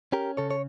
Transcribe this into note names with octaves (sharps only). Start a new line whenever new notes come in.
C#4 G4 A#4
C#3 A4 C#5
C#5